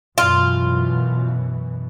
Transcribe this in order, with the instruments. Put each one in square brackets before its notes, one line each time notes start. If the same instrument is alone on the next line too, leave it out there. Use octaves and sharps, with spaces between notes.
[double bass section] F#2 B2 E3 [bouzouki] F4